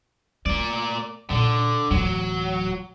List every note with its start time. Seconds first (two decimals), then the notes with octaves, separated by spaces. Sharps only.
0.46 A3 A#3 D5
1.30 A#2 D3
1.91 D1 E3 F#3